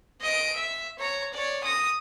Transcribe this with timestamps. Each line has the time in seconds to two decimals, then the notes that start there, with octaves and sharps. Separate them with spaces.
0.22 D#5 D7
0.56 E5
0.99 C#5 A#5
1.34 C#5 D5
1.64 D#6 A#6